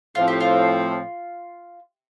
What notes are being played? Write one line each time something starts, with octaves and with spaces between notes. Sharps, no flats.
A2 F3 C4 F4
G4
F4